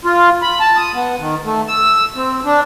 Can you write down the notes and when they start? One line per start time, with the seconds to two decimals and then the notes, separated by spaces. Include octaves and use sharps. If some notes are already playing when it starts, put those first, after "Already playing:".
0.05 F4
0.42 B5
0.60 A5
0.77 D#6
0.94 B3
1.20 D#3
1.44 A3
1.68 E6
2.16 C4
2.45 D4